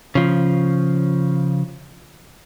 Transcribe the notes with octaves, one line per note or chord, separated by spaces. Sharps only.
C#3 F3